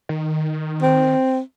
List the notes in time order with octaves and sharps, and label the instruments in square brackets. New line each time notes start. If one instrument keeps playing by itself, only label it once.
[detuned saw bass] D#3
[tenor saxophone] C4